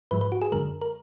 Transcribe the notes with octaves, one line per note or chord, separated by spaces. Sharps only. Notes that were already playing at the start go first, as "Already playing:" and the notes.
G#2 F3 G#3 B4
B4
F#4
G#4
F#2 D3 G#3 A#4
A#4